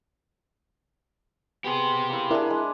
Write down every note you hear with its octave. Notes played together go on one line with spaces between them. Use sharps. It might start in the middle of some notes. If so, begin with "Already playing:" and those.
B3 G4 G#4 C5
A#3 E4
D4 E4 G#4 A#4
G#3